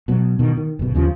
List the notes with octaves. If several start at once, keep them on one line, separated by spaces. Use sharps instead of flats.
B2 F#3
B2 D#3
D#3
F#1 B2
D#2 C#3 F3